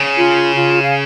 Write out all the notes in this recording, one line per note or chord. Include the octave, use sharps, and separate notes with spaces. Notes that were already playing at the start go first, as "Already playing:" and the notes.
Already playing: C#3
F4
F4
F5